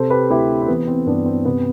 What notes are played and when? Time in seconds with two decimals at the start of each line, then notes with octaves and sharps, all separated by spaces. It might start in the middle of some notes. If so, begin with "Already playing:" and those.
Already playing: C3 A4 C5
0.10 G4 B4
0.30 D2 E4 G4
0.62 C4
0.68 E3 B3
0.87 C4
1.06 G2 B3 D4
1.26 C4
1.45 C3 B3